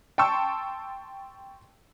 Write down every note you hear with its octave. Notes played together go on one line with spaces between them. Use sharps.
G5 A5 C6 C#6 E6